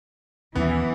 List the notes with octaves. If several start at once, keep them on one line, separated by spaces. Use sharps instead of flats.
D#2 E3 B3 C#4